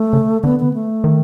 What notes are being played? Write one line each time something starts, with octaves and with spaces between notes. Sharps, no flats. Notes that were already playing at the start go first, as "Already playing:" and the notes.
Already playing: A3
C#3
D3 B3
B3
A3
D#3